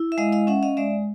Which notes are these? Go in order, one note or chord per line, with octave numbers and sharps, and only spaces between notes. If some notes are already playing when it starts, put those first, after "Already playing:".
Already playing: E4
E5
G#3 D#5 F5
D#5 F5
C#4 E5 F#5
D#5 F5
G#3 D5 E5